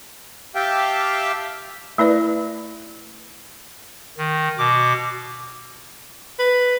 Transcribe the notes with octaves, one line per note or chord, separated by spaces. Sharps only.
G4 E5 F5 G5 A5
A3 E4 B4 D5
D#3
B2 D6
B4